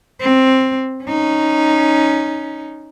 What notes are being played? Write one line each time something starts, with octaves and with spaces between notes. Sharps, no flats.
C4
C#4 D#4